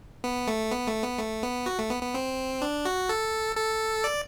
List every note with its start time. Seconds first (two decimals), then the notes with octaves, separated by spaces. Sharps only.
0.24 B3
0.48 A3
0.72 B3
0.87 A3
1.03 B3
1.19 A3
1.43 B3
1.66 F#4
1.79 A3
1.90 B3
2.03 B3
2.14 C4
2.62 D4
2.85 F#4
3.09 A4
3.56 A4
4.04 D5